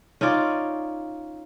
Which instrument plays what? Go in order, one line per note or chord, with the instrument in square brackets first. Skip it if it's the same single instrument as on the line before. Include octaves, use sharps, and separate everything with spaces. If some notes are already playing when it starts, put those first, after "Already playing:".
[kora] C#4 D#4 F4 D5